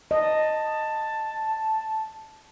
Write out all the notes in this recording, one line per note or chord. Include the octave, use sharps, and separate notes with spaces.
D#5 A5